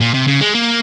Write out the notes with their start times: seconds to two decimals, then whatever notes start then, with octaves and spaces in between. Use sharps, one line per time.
0.01 A#2
0.14 C3
0.27 C#3
0.41 G#3
0.54 A#3